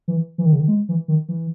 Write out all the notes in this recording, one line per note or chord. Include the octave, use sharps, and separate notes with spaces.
E3
E3
D#3
C#3
D#3
G#3
E3
D#3
E3